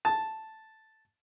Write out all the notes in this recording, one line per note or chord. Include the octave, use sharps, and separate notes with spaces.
A5